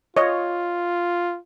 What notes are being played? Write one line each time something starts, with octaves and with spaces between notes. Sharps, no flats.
F4 C#5 D#5